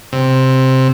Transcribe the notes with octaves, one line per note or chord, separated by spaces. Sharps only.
C3